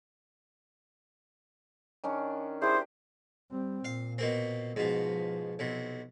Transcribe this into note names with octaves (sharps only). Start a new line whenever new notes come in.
D#3 C#4 D4
D4 E4 G4 G#4 C5
G3 C4
A#2 F5
B2 A#3 C4
G#2 B2 F3
B1 C3